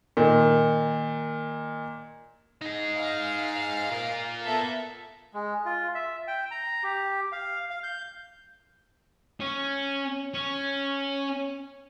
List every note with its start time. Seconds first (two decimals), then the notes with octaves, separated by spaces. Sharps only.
0.17 A#2 D#3
2.62 D#4 G#4
2.96 F5
3.90 F4 A#4
4.42 B3 A4 E5
5.34 G#3
5.66 F4
5.95 E5
6.28 G5
6.51 A#5
6.84 G4
7.32 F5
7.70 F5
7.83 G6
9.40 C#4
10.34 C#4